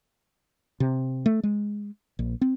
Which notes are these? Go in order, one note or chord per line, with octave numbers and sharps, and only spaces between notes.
C3
A3
G#3
A#1
C4